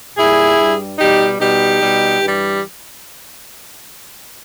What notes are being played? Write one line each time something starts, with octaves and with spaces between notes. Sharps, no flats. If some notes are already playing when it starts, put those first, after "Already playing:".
A#2 G3 E4 G#4
G2 G3
B2 G3 D#4 G4
B2 G3 D#4 G4
B2 G3
G2 E3 G3